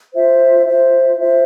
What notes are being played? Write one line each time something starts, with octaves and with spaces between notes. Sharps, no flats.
F4 C5 E5
F4 C5 E5
F4 C5 E5